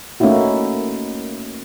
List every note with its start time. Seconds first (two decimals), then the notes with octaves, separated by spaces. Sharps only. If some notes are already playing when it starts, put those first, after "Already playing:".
0.20 A3 A#3 C#4 D#4 E4 F#4